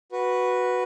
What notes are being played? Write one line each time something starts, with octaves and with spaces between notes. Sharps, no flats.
F#4 B4